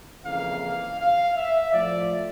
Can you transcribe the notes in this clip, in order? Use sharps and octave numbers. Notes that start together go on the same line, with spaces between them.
F2 C#3 E3 A#3 F5
F5
F5
E5
A2 F3 A3 D5